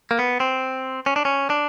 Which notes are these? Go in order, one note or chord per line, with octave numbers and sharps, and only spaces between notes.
A#3
B3
C4
C#4
D4
C#4
D4